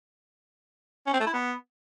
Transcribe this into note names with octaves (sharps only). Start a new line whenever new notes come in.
C#4
C4
A3
E4
B3